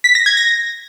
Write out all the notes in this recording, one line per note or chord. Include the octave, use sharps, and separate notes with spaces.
B6
A#6
G#6
A#6